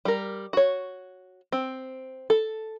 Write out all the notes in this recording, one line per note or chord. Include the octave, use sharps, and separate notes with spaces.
G3 A#4
F#4 C#5
C4
A4